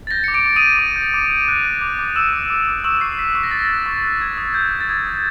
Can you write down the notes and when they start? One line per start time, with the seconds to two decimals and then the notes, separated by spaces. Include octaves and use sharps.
0.07 A6
0.11 G6 A#6
0.24 D6 C#7
0.34 D6 D7
0.46 D6
0.56 D#6 D#7
0.62 G6
0.79 D6
0.96 G6
1.14 D6
1.30 G6
1.48 F#6
1.65 F#6
1.82 D6
1.99 D6
2.16 D6 E6 E7
2.33 D6
2.50 D6
2.67 D6
2.84 C#6 E6 E7
3.01 C#6 C7
3.19 F#6 B6
3.35 C#6 B6
3.44 A#6
3.51 C#6 A6
3.59 A#6
3.70 F#6
3.86 C#6
4.04 F#6
4.20 D#6 G#6
4.38 D#6
4.54 G6
4.71 D#6
4.80 A6
4.89 D#6 G#6
5.07 D#6